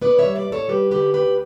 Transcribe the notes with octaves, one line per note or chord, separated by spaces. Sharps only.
B3 B4 D5
C#5 E5
G3
B4 D5
A2
A4 C#5
G3 G4 B4
D3 G4 B4
D2 G4 B4